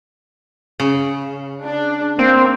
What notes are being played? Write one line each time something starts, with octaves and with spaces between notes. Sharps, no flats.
C#3
D4
A#3 C4